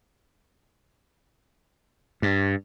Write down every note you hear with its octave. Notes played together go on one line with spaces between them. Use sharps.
G2